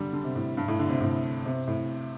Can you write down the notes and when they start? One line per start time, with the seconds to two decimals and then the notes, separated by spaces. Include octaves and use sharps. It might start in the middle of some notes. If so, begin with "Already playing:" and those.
Already playing: D3 G3
0.13 D3
0.24 C3
0.36 A2
0.57 G2
0.68 A2
0.79 D3
0.90 C3
1.01 A2
1.45 C3
1.67 A2